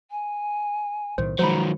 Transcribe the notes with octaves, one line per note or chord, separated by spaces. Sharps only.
G#5
B1 A2 D#3 C5
D#3 F3 F#3 G#3 C5 A#5 B5